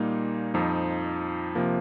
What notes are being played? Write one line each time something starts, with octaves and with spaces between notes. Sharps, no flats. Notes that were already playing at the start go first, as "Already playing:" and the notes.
Already playing: A#2 G3 A#3 D#4
F2 F3 D#4
C3 F3 A#3